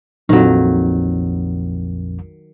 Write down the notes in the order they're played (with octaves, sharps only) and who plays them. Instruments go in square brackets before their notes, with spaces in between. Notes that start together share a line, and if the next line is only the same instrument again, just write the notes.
[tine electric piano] A#1 F2 [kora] D#3 F#3